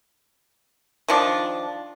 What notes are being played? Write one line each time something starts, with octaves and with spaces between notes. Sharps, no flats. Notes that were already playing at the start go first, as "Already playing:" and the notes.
D#3 F3 D4